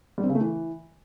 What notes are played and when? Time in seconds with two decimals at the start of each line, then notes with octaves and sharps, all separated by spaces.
0.18 G3
0.24 C4
0.29 C#3
0.35 A3
0.41 E3